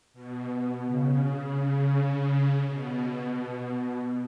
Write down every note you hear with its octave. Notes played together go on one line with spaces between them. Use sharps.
B2
B2
C#3
B2